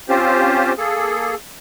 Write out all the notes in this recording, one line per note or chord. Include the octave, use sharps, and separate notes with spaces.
C4 C#4 F4 G4 C5
A#3 G#4 A4